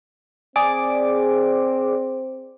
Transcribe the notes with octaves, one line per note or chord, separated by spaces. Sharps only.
C4 G#4 D5 D6